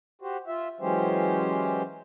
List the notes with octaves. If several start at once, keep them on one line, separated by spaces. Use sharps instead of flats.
F#4 G4 C5
F4 E5
E3 F#3 G#3 C#4 G4 C5